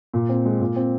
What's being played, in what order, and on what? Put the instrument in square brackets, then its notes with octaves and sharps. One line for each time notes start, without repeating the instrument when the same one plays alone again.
[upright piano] A#2
C4
G#3
A#2
C4